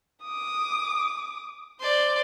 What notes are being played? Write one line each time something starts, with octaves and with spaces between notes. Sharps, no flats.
D6 D#6
C5 D5 C6